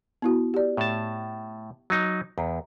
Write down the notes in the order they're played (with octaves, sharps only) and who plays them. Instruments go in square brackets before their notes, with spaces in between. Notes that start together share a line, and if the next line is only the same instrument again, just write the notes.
[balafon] B3 E4 F#4
G4 D5
[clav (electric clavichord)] A2 A5
F#3 D#4
[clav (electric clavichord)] E2 [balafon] A#5